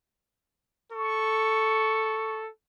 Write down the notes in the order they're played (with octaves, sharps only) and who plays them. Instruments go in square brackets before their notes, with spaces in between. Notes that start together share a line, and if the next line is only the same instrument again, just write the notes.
[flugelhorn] A4 [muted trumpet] C#6